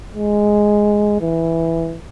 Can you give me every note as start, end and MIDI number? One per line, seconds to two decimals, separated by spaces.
0.15 1.19 56
1.21 1.97 52